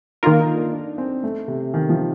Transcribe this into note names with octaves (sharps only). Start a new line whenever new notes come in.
D#3 A#3 D#4 F4 A#4
D#4
D4
D4
C4
A3
C3
D#3
F3